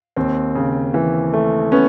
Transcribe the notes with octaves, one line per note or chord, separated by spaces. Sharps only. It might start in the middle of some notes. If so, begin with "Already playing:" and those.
D#2 C4
C#3
E3
A3
B3 C#4